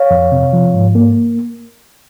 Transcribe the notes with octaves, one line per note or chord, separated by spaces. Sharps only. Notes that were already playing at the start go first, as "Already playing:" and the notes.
Already playing: C#5 F5
F2
C3
F3
G#2
A#3